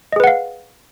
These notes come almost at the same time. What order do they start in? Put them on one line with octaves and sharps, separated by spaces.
D#5 G#4 B4 F#5 F5